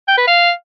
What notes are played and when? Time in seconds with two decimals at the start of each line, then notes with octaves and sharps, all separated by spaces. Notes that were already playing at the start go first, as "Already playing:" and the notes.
0.08 G5
0.18 B4
0.27 F5